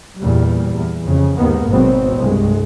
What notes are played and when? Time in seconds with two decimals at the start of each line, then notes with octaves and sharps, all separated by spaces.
0.18 E2 A#2 G3
0.74 E2
1.06 F2 C#3
1.37 D#2 G#2 D#3 A#3 B3
1.67 G#1 G#2 B2 F#3 B3 C4
2.17 C2 G2 G#3